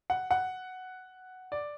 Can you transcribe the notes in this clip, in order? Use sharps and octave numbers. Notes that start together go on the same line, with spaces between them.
F#5
F#5
D5